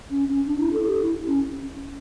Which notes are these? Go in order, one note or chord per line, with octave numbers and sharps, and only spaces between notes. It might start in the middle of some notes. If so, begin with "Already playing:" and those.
C#4
C#4
D4
E4
A4
G4
E4
C#4